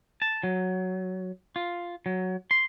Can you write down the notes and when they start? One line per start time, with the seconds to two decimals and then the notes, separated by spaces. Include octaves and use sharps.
0.22 A5
0.43 F#3
1.56 F4
2.06 F#3
2.51 C6